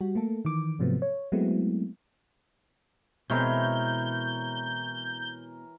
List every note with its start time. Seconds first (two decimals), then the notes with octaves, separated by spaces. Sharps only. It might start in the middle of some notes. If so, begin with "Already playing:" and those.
0.01 G3 F#4
0.15 A3 A#3 A4
0.45 D#3 E3 D6
0.79 G#2 C3 F3 F#3 A3 B3
1.02 C#5
1.32 F#3 G#3 A3 B3 C4 E4
3.30 B2 E3 G#3 C4 A#4 C#5 G6